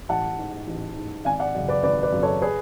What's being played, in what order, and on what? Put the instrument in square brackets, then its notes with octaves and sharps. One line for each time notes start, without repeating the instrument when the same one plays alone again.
[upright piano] A1 F#5 A5
G#2
A1
G#2
G#1 F5 G#5
D5 F#5
F#2 C#3
B4 D5
G#1 B4 D5
B4 D5
F#2 C#3
A4 C#5
G#4 B4